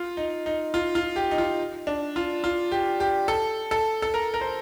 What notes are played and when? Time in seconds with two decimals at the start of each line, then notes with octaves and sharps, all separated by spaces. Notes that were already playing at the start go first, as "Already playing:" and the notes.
Already playing: F4
0.17 D#4
0.46 D#4
0.74 F4
0.95 F4
1.16 G4
1.31 D#4
1.38 F4
1.87 D4
2.16 F4
2.44 F4
2.72 G4
3.00 G4
3.28 A4
3.71 A4
4.02 A4
4.14 A#4
4.34 A#4
4.41 C5